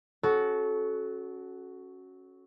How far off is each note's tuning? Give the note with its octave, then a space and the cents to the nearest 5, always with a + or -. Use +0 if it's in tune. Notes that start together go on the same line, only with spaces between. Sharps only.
C#4 -10 F#4 +5 A4 -25